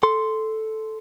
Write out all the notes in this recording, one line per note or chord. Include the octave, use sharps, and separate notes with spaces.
A4 C6